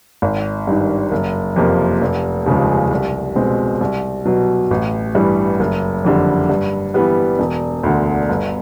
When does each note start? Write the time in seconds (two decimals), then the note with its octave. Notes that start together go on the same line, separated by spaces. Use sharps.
0.22 G#1
0.67 G2 D#3
1.12 F#1
1.56 F2 C3 F3 A#3
2.01 F1
2.46 D#2 C#3 F3 G#3
2.91 C2
3.36 B2 G#3 C4
3.81 C2
4.25 B2 F#3
4.71 A1
5.15 G2 E3 G3
5.60 F#1
6.04 F2 D3 G3
6.49 G2
6.94 E3 G3 B3
7.39 E1
7.83 D2 D3
8.29 G1